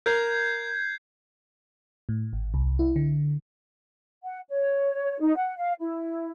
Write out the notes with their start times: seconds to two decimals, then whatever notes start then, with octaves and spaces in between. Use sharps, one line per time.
0.06 A#4 G6 G#6 C7
2.09 A2
2.33 G#1
2.54 C2
2.79 E4
2.96 D3
4.24 F#5
4.49 C#5
5.20 D#4
5.36 F#5
5.57 F5
5.80 E4